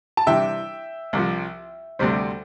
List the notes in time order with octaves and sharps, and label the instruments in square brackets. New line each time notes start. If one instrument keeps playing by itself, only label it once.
[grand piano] A5
[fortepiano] C3 E3 G3 D4 [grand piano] E5 G5
[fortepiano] C2 C3 F3
D2 C3 G3 C4